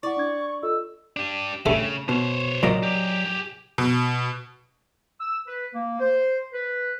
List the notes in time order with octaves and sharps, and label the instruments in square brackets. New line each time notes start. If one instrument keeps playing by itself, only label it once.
[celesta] E4 F#5 [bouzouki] D5 [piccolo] C#6
[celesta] D4 G#6
[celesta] F4 A4 D#5 [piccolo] E6
[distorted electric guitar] D4 G4
[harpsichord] G2 G3 A3 [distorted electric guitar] C#3
[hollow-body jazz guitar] B2 [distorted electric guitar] C5 C#5
[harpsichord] A#2 [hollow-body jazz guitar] F#3 D5 D#5
[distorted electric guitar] G4 G#4
[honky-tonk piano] B2
[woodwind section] E6
B4
A#3
C5
B4